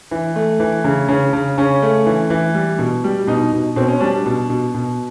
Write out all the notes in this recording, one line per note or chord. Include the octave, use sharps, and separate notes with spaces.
E3
A3
E3
C#3
C#3 C#4
C#3
C#3 C#4
A3
E3
E3
G3
B2
G3
B2 D#4
B2
B2 C4
C#4
G3 D4
B2
B2
B2